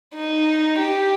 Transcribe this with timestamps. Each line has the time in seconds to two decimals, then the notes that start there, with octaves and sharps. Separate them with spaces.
0.14 D#4
0.79 G4